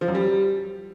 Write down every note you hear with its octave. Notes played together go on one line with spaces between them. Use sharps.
F3
F#2
G3